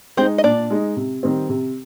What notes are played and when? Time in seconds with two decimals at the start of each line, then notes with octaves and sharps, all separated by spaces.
0.17 G#3 C4 D#4 C5
0.38 D#5
0.43 A#2 D4 D5
0.70 G#3 D#4
0.96 C3
1.23 D#3 G3 C4
1.49 C3